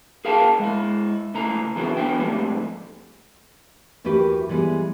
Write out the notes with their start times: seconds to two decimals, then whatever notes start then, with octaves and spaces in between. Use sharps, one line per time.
0.25 G#4 A#4 F5 G5 A5
0.59 G#3 E4
1.34 C#2 A2 A3 A#5
1.75 E2 C#3 F#3 B3 E4
1.97 E2 E3 B3 D4 B4 G5
2.20 F2 G#2 G3 A3
4.04 D#2 E3 F#4 G4 B4
4.49 E3 G3 G#3 B3